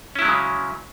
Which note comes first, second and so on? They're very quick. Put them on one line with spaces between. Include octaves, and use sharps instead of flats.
C#4 E4 F#3 G#3 C#3